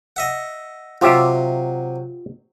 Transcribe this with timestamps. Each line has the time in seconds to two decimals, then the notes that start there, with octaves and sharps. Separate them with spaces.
0.16 D#5 E5 F#5
1.01 C3 F#3 F4 G4 E5